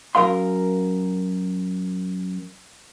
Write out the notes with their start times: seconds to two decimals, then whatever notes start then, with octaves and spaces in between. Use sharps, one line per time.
0.15 F#2 A#4 F5 C6